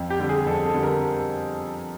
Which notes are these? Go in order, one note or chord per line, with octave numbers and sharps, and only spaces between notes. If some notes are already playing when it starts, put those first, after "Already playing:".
Already playing: F2
G4
D3 G3
G#4
F2 A4
A4
D3 G3
A#4